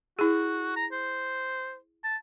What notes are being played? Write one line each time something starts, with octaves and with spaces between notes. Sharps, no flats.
E4 F#4 G#4
A#5
C5
A5